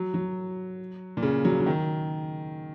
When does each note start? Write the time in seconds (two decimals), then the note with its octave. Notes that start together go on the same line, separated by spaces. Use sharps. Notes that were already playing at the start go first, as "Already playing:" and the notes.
Already playing: F#3
0.14 F#3
1.17 A#2
1.23 C#3
1.45 F#3
1.60 F#3
1.66 D#3